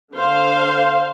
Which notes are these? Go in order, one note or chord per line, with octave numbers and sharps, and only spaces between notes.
D3 C5 F5